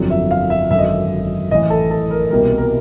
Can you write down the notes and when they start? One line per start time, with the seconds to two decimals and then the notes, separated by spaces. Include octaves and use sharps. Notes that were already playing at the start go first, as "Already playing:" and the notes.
Already playing: G1 F2 D3 F#3
0.10 E5
0.31 F5
0.50 E5
0.70 G#1 F#2 D3 E5
0.78 D#5
0.85 E5
1.51 A1 A2 E3 D#5
1.70 A4
1.91 A4
2.11 A#4
2.31 C2 B2 G3 A#3 A#4
2.58 A#4